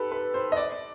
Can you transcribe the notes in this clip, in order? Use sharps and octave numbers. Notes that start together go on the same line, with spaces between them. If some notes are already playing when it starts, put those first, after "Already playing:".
Already playing: G4 A4 B4
B4
C5
D#5
D5